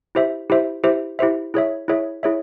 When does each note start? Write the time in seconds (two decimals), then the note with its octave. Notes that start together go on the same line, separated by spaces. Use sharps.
0.15 E4 G4 C5 E5
0.50 E4 G4 C5 E5
0.84 E4 G4 C5 E5
1.19 E4 G4 C5 E5
1.54 E4 G#4 C#5 E5
1.88 E4 G#4 C#5 E5
2.23 E4 G#4 C#5 E5